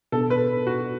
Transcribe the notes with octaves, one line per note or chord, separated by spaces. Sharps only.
B2 B3 D4 A4
B4
F#4